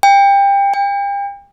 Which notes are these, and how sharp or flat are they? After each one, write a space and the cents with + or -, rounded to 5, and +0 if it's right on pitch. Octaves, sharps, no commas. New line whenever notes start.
G5 +25
G5 +40